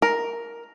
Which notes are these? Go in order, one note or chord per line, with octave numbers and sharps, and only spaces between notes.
A#4